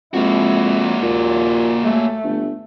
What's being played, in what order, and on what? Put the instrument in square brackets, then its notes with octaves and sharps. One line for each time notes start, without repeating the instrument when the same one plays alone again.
[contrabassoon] F2 [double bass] G#3 E4 [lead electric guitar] A#3 F#4
[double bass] D#2 [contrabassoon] A#2
[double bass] A3
[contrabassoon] G1